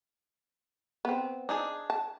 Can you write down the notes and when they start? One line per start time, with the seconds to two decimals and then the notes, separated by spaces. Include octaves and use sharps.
1.05 B3 C4
1.49 D4 D#4 G#4
1.90 A5